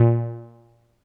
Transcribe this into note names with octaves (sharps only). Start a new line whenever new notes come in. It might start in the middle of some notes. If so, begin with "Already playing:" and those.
Already playing: A#2